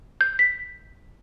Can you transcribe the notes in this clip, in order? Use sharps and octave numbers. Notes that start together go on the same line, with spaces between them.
G6
B6